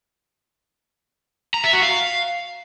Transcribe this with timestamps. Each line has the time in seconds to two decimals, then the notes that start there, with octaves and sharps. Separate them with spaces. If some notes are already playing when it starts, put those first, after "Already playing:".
1.54 A#5
1.64 E5
1.73 F#4
1.82 F5